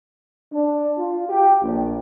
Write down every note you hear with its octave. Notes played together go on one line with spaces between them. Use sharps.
D4
F4
G4
A#1